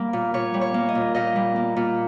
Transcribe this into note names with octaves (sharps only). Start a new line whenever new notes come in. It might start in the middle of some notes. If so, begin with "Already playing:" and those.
Already playing: G3 A#3
A#2
A#2 C#5
G3
C#5
A#3
D#5
A#2
A#2 D#5
G3
A#3
A#2